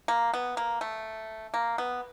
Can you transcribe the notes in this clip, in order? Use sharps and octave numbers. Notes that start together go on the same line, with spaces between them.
A#3
B3
A#3
A3
A#3
B3